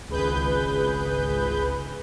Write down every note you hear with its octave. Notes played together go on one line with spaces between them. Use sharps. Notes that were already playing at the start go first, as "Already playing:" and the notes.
G#1 C#2 G#4 B4 G6